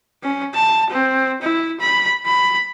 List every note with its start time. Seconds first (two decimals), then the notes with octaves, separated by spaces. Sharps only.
0.23 C#4
0.54 A5
0.90 C4
1.42 E4
1.81 B5
2.26 B5